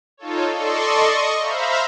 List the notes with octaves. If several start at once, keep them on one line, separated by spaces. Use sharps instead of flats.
D#4 F4 A4 C#5
A4 D5 D#5 C6 C#6
D#5 C#6
C5 E5 F5 A#5 B5